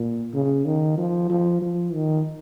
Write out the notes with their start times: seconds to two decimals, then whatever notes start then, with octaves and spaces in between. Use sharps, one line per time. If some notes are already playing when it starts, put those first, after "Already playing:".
Already playing: A#2
0.34 C#3
0.65 D#3
0.98 F3
1.30 F3
1.62 F3
1.94 D#3